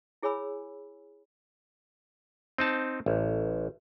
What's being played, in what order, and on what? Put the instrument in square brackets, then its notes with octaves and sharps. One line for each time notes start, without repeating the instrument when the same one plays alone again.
[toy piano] E4 G#4 C#5 G#5 B5 E6
[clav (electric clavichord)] C4 D#4 A5
A1